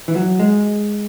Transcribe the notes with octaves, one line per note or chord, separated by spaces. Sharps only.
E3
F#3
G#3